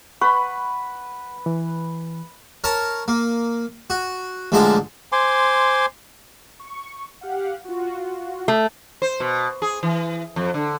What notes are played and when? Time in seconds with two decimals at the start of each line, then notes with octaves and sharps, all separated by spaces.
0.21 B4 F#5 B5 C#6
1.46 E3
2.64 A#4 C#5 A5 A#5
3.08 A#3
3.90 F#4
4.52 A1 D3 F3 G#3 A5 A#5
5.12 C5 G#5 C6 D6
6.60 C#6
7.21 G4 F5 F#5
7.64 F4 F#4
8.48 A3
9.02 C5
9.20 B2
9.62 G#4
9.83 E3
10.36 F2
10.54 D3